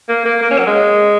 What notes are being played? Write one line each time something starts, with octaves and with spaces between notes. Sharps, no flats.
A#3
A#3
A#3
C#4
F#3
G#3